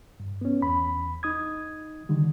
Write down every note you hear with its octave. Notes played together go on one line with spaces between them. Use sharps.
G2
B3 C#4
E2 B5
D#4 D#6 G#6
D3 D#3 G3